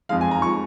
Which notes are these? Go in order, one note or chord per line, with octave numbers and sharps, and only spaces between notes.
F2 F3 G#3 F5
G#5
A#5
F3 G#3 C#6